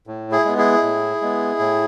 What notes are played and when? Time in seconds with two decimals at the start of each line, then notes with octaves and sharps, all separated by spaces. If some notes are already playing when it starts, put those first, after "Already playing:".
0.07 A2
0.32 E4 G#4
0.45 G#3 B3
0.58 E4 G#4
0.83 A2
1.21 G#3 B3
1.59 A2